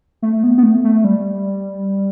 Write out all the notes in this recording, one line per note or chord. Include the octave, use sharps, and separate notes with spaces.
A3
A3
B3
B3
A3
A3
G3